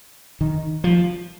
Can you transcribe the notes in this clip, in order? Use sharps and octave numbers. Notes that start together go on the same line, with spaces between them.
D#3
F3